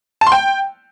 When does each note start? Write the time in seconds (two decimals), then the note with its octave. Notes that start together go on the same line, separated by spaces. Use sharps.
0.21 A5
0.27 C6
0.32 G5